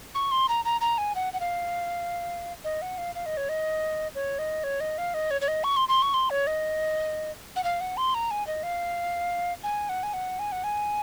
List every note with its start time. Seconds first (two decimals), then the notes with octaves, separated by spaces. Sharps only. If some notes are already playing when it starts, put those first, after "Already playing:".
0.15 C#6
0.31 C6
0.48 A#5
0.65 A#5
0.81 A#5
0.98 G#5
1.15 F#5
1.33 F#5
1.40 F5
2.64 D#5
2.82 F#5
2.98 F5
3.15 F5
3.26 D#5
3.37 C#5
3.49 D#5
4.15 C#5
4.39 D#5
4.64 C#5
4.80 D#5
4.98 F5
5.14 D#5
5.31 C#5
5.41 C#5
5.48 D#5
5.64 C#6
5.76 C6
5.88 C6
6.02 C#6
6.14 C6
6.30 C#5
6.47 D#5
7.56 F#5
7.64 F5
7.80 F#5
7.97 C6
8.14 A#5
8.31 G#5
8.47 D#5
8.63 F5
9.63 G#5
9.89 F#5
10.03 G#5
10.13 F#5
10.39 G#5
10.52 F#5
10.64 G#5